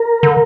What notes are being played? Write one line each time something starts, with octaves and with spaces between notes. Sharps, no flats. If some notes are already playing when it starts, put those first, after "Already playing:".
Already playing: A#4
D3